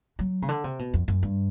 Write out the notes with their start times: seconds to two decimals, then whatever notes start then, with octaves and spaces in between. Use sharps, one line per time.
0.19 F#3
0.42 C#3
0.49 D3
0.64 C3
0.79 B2
0.94 F2
1.08 F#2
1.23 G2